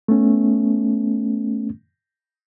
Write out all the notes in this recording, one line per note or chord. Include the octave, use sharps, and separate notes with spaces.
A3 B3 C#4